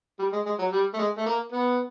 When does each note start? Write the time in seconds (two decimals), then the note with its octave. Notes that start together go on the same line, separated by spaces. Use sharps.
0.19 G3
0.33 G#3
0.46 G#3
0.59 F#3
0.72 G3
0.94 A3
0.98 G#3
1.18 A3
1.26 A#3
1.52 B3